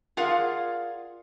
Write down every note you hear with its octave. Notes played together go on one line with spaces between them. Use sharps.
F4 G#4 A#4 D5 F5 F#5